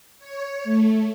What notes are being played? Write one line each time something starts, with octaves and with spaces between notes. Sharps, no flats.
C#5
A3